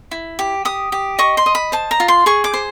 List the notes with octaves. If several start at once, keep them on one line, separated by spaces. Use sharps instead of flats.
E4
G4
G4 D#6
G4
D#5 C#6
C6
D#5
B5
C5 A5
A#5
F4
C6
G#4 C#6
D6
C5